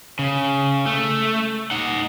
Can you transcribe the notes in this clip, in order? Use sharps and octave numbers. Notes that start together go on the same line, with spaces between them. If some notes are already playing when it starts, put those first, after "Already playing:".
C#3
A3
D#4 F#5